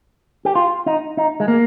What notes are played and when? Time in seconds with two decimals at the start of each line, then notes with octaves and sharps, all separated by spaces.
0.45 G4
0.55 F4
0.86 D#4
1.17 D#4
1.40 G#3
1.48 A#3